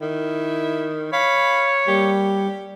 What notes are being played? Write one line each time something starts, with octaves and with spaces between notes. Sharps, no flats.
D#3 E4
C#5 F5 B5
G3 A#3 G4